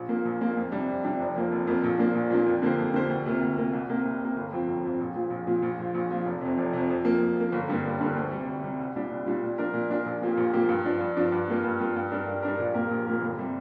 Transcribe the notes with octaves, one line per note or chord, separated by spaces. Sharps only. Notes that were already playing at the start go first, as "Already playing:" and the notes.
Already playing: A#1
A#2 A#3
A#1
A#2 A#3
F2
C3 G3 D4
F2
C3 G3 D4
F1
F2 F3 A#3
F1
F2 F3 A#3
A#1
A#2 F3 A#3 D4
A#1
A#2 F3 A#3 D4
F2
D3 A#3 G4 C5
F2
D3 A#3 G4 C5
D2
C3 A#3 F4
D2
C3 A#3 F4
C2
C3 A#3
C2
C3 A#3
G1
F2 F3 C4
G1
F2 F3 C4
A#1
A#2 F3
A#1
A#2 F3
A#1
A#2 F3
A#1
A#2 F3
F1
F2 C3
F1
F2 C3
F2
F3 A#3
F2
F3 A#3
G1
G2 D3 G3 A#3
G1
G2 D3 G3 A#3
D2
C3 G3
D2
C3 G3
C2
A#2 G3 D4 G4
C2
A#2 G3 D4 G4
A#2
F3 D4 A#4
A#2
F3 D4 A#4
A#1
A#2 F3 A#3 G4
A#1
A#2 F3 A#3 G4
G2
F3 D4
G2
F3 D4
G2
G3 A#3 F4
G2
G3 A#3 F4
G2
G3 D4 A#4
G2
G3 D4 A#4
A#1
A#2 A#3 G4 A#4
A#1
A#2 A#3 G4 A#4
G1
C3 G3